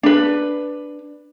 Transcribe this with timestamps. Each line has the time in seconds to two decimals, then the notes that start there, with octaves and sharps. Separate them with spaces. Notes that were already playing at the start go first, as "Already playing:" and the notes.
0.03 D4 B4